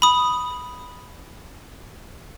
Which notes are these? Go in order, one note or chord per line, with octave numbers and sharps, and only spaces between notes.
B5 D#6